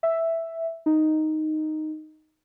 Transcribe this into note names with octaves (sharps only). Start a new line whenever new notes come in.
E5
D#4